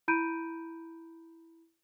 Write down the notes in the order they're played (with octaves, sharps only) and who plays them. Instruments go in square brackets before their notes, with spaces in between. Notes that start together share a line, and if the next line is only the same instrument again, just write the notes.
[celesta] E4 A#5 B5 G6 D7 D#7